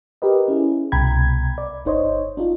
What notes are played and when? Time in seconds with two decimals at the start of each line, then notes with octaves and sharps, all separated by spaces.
0.22 G4 A#4 B4 D#5
0.48 C#4 E4 G#4
0.92 C2 B2 G5 A#5 B5 G#6
1.58 D5
1.85 G1 D#4 C5 C#5 D#5
2.37 D4 D#4 F4